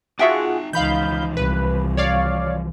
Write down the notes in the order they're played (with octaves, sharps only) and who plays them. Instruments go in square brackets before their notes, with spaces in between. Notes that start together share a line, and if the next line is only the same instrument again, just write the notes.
[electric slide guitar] D#4 A5 [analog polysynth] F4 G#4 F#5 [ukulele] F#4 E5 G5
[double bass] C#2 D#4 [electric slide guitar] E3 F3 [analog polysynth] F5 B5 G6
[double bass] C2 [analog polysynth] B4
[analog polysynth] C#5 D5 F5